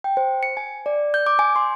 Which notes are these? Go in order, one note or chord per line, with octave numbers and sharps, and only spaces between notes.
G5
C5
C#7
G#5
D5
G6
D6
G#5
C6